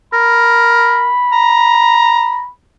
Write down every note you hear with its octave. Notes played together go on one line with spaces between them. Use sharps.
A#4 B5
A#5